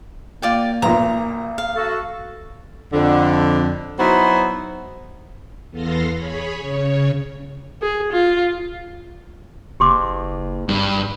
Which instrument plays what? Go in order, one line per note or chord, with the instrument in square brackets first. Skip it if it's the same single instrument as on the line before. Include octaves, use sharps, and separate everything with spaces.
[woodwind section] A#3 [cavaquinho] F4 D5 G5
[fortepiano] B1 A#2 [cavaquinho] A#5
[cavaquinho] F5
[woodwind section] A3 F#4 A4
[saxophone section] F2 D3
F#3 B3 D#4 E4 F#4 C5
[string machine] E2 B3 A4 F5 C6 A#6
G#4 C#5 B5
C#3 C#5
[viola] G#4
F4
[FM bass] F#1 [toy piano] G4 C6 D6
[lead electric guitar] G2